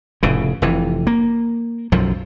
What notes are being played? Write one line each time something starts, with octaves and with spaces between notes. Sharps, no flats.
F1 A2 C#3
F1 C3 E3
A#3
B1 F#2 F3